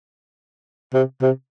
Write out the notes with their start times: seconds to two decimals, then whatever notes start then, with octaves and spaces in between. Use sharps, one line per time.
0.94 C3
1.22 C3